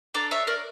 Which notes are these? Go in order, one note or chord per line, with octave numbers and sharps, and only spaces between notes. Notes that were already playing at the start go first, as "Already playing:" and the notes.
D4 A4 A#5 D6
C#5 E5
A#4 D5